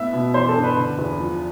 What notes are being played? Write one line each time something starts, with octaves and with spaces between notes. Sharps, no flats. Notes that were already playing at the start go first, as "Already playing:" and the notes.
Already playing: A2 B3 E5
B2
E3 C5
A4
G2
B4
D3
E2
F3